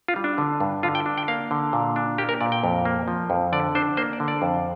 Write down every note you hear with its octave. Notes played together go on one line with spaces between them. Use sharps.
F4
G3
D4
D3
G2
D3 F4
G5
D4
G5
A#3 F5
D3
A#2
D4
A#3 G4
A#4
A#2 D5
G5
F2
A#3
F3
F2
D3 D5
D4 C5
A#3 C5
D5
D3
D5
F2